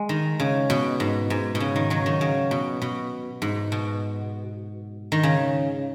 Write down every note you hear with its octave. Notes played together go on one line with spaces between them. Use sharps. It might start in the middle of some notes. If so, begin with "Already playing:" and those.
Already playing: G#3
D#3
C#3
B2
G#2
G#2
B2
C#3
D#3
C#3 F#3
D#3
C#3
B2
B2
G#2
B2
D#3
C#3